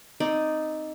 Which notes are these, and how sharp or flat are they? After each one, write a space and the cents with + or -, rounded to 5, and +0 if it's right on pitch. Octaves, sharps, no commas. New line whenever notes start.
C4 +0 D#4 +0 D5 +0